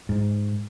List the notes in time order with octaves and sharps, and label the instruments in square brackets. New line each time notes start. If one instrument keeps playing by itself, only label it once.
[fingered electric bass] G#2